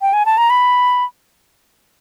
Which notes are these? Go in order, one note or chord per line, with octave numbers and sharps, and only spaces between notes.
G5
G#5
A5
A#5
B5